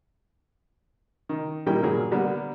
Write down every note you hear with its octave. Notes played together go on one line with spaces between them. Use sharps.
D#3
A#2 D#3 G3 E4 A#4 G5
G2 A#2 F#3 G#4 A#4
D3 G3 A#3 B3 D4